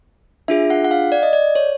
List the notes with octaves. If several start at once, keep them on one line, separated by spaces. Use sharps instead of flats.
D4 F4 G#4 E5
F#5
F#5
F5
D5
D#5
D5
C#5